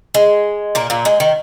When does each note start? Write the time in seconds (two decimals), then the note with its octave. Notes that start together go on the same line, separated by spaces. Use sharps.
0.14 G#3
0.75 A#2 A#3
0.90 A#2 A#3
1.05 G#3
1.20 D#3